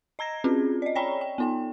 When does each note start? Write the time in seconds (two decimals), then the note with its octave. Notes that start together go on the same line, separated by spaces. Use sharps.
0.19 D#5 A#5 G#6 A#6
0.44 C4 C#4 F4 G#4
0.82 D5 D#5
0.95 C#5 D5 G5 A#5 B5
1.21 G5
1.38 B3 D#4 G5